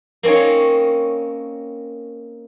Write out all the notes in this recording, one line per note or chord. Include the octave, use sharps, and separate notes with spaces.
A#3 C4 C#4 D#4 C#5